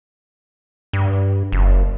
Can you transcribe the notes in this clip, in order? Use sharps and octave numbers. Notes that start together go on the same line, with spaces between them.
G2
F#1